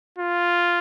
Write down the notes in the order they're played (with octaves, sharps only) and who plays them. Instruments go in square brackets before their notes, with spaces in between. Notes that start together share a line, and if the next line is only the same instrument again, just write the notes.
[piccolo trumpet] F4